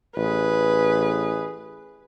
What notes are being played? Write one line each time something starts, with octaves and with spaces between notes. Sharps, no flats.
A1 G#4 B4